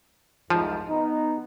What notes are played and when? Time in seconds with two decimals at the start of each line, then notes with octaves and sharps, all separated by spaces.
0.50 C2 F2 G#2 F3
0.89 B3 D#4